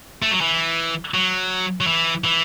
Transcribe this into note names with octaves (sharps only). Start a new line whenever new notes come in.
A3
F#3
E3
F#3
F#3
E3
E3